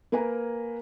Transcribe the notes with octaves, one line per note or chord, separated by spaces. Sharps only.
A#3 A#4 B4 G#5 A#5